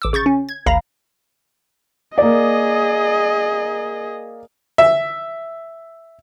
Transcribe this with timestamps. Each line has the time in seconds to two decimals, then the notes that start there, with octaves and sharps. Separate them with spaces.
0.02 A1 D6 E6
0.13 C#3 C#6 G6 A6
0.26 C#4
0.49 G#6
0.66 G#1 D2 F5 A#5 B5 A#6
2.18 A#3 G#4 D5 D#5
4.78 E5